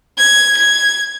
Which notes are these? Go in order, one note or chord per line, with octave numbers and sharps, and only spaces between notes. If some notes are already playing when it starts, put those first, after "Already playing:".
G#6
G#6